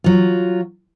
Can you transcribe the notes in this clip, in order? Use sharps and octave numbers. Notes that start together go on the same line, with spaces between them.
F#3 F4